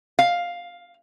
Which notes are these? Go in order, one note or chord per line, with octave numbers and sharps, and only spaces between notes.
F5